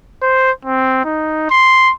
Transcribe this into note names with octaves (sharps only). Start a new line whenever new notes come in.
C5
C4
D#4
C6